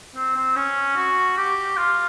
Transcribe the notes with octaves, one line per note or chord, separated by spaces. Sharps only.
C4
C4
C#4
F#4
G4
F4